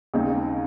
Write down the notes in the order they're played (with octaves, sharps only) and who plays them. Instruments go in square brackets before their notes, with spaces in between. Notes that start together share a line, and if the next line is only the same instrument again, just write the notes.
[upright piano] D#2 C#3 G#3 C4 D#4